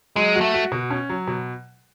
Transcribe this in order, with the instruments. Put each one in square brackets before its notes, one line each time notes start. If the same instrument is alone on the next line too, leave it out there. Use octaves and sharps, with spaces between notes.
[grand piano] F#3 [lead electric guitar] G#3
[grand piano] F#4
[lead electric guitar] A3
[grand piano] F#4
B2
C#4
F#3
B2